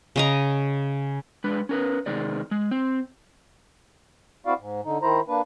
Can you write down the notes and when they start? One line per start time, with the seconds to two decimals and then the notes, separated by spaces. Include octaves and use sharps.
0.16 C#3 D#5 A#5
1.44 G#3 D4 B4
1.69 C#4 A#4 B4
2.06 C3 D#3 G#3 D5
2.51 G#3
2.71 C4
4.46 C4 E4 F#4 D5 F5
4.59 G#2
4.85 D3 D#4
5.02 D#3 E4 C5 A#5
5.28 A#3 D4 B4